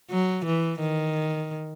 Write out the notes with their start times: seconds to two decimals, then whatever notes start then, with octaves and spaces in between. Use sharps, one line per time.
0.10 F#3
0.45 E3
0.80 D#3